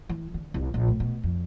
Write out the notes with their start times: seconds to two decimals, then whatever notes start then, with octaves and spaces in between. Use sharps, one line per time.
0.09 E3
0.34 D3
0.54 C2
0.74 A#1
0.88 A2
1.00 B2
1.23 F2